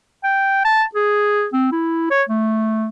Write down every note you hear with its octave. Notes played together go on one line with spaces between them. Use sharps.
G5
A5
G#4
C4
E4
C#5
A3